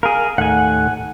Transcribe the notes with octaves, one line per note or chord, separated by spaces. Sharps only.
G#4 A#4 F5
D#2 A2 F#5 G#5